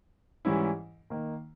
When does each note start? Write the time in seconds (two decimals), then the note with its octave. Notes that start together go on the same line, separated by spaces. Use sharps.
0.45 G#2 E3 G3 C#4 E4
1.10 D#3 A#3 D#4